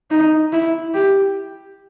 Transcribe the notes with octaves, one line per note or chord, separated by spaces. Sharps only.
D#4
E4
G4